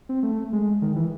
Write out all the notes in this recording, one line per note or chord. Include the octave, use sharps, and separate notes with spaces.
C4
A3
G#3
D#3
E3